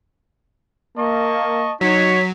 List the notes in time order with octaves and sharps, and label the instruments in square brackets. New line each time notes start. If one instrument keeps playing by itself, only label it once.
[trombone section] A#3 [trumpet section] D#5 A5 C#6
[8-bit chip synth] F#3 [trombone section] D#4 [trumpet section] F#4 C#5 [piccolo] B6